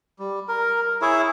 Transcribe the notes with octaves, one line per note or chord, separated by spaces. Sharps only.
G3
A#4
E4 G#4 C#5 E5